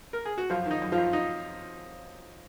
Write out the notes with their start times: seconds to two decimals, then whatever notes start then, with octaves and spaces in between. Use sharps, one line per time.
0.13 A#4
0.25 G#4
0.38 F#4
0.50 F#2 F3 F4
0.66 D#3
0.71 D#4
0.82 F#2
0.92 F3 F4
0.98 F#2
1.13 D#4